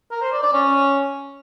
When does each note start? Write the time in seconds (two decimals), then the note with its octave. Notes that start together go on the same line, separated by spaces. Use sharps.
0.11 A#4
0.22 C5
0.32 D5
0.43 D5
0.53 C#4